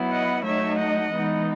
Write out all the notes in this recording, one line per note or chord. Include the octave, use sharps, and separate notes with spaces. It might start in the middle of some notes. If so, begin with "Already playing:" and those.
Already playing: F#3 B3 E4
D#5 F#5
F#3 A3 D#4 C#5 E5
D#5 F#5
E3 G#3 B3 D#4